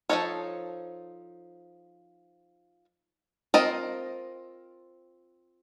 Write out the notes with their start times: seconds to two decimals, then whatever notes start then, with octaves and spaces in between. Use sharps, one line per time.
0.09 F3 A#3 D#4 A4 C#5
3.54 C4 F4 A#4 D#5